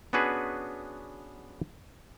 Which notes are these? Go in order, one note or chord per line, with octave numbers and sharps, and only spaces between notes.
B3 C#4 D4 F#4 G#4 B4